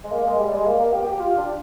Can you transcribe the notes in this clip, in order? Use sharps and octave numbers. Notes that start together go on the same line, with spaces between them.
G#3
A#3
G#3
G3
G#3
A#3
A#3
G4
G4
F4
D4